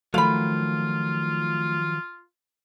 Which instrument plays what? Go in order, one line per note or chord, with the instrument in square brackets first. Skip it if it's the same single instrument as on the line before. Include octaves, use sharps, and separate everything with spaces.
[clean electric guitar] D#3 F3 F#3 [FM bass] A3 [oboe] F4 [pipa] F5 B5